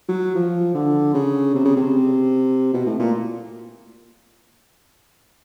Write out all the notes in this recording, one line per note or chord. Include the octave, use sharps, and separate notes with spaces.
F#3
F3
D3
C#3
C3
C#3
C3
B2
A2
A#2